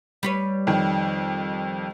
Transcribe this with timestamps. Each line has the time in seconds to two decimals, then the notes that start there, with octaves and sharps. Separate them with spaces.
0.23 G3 B4 C#5
0.67 F2 D#3